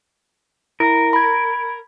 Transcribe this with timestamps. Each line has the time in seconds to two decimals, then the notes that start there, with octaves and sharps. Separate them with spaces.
0.80 E4 A#4
1.13 B5 G#6